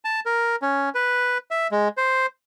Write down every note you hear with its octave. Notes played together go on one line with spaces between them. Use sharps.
A5
A#4
C#4
B4
E5
G#3
C5